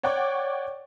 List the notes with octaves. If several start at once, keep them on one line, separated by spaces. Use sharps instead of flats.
C#5 D5 F#5 G5 C#6 D6